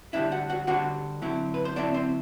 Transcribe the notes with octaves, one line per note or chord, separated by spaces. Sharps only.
D3 G3 D4 E4 E5
F#4 F#5
F#4 F#5
D3 G3 D4 F#4 F#5
D3 F#3 C4 E4
B4
C5
D3 F#3 C4 D4 E4 D5
C4 C5